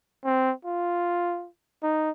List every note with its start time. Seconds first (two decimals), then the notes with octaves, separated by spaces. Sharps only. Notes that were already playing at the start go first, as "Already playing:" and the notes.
0.25 C4
0.65 F4
1.83 D#4